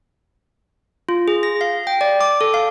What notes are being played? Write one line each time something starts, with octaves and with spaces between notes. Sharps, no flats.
F4
G#4
A#6
F5
G5
D5
D6
A4
F5